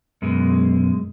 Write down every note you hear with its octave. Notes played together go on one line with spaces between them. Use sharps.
F#2 B2 G#3